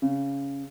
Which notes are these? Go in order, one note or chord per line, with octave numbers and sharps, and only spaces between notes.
C#3